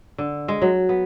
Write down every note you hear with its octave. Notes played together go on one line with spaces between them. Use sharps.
D3
G#3
F#3
B3